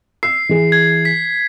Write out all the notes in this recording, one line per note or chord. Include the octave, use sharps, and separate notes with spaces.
E6 C7
E3 G#4
G#6
B6